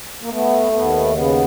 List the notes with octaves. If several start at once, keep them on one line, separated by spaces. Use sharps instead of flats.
A#3
A3 B3
D#2 B3
C#3 B3